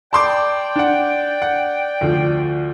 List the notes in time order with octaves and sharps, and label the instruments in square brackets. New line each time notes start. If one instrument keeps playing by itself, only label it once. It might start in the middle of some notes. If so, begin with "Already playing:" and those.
[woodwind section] D5 G5 [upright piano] A5 C6 D6
[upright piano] D4 F#5
F#5
D2 F3